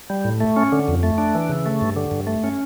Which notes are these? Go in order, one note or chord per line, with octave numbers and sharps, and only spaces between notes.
G3
A2
A3
C#4
D3
F2
A3
D4
E3
C#3
A3
G2
D3
G2
A3
C#4